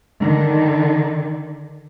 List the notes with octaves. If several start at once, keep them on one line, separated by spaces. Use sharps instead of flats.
D3 D#3